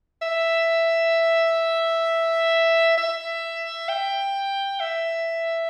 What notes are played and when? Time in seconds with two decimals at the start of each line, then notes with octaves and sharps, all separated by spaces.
0.22 E5
2.98 E5
3.89 G5
4.80 E5